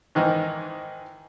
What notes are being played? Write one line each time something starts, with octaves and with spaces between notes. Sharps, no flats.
G#2 D#3 E3 D#4 A#4